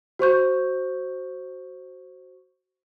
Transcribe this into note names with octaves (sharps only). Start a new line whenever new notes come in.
F#4 C5 C#6 G6